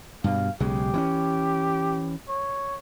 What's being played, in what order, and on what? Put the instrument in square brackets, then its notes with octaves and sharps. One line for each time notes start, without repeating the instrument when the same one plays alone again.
[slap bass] G2 B2 [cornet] F5
[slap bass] B1 C#3 G#3 [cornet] G4
[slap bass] E3 C4 C#4
[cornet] C#5